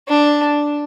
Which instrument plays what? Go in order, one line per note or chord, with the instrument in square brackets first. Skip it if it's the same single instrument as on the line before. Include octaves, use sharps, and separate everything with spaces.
[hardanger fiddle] D4